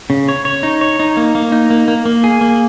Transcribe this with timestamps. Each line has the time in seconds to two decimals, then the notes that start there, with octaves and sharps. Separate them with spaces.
0.10 C#3
0.29 C#5
0.45 C#5
0.63 D#4
0.81 C#5
1.00 D#4
1.17 A#3
1.35 A#3
1.52 D#4
1.70 A#3
1.88 A#3
2.05 A#3
2.24 G#4
2.41 A#3